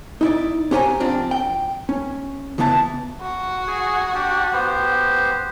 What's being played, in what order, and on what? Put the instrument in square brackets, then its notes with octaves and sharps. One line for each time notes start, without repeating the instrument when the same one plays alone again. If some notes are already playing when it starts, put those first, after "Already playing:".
[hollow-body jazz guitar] D#4 E4 D5
C#4 G4 C5 G5 G#5 A#5
F2 F3 C4 D4
G5
C#4
C#2 E3 B3 E4 A5
[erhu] F#4
[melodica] G#4 G#5
D4 G4 D5
B3 G4 C5